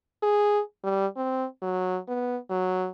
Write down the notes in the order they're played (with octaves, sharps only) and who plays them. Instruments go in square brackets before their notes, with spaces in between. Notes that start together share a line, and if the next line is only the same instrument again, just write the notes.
[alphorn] G#4
G3
C4
F#3
B3
F#3